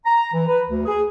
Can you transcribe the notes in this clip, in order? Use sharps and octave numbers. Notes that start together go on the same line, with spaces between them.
A#5
E3
B4
D2
G#4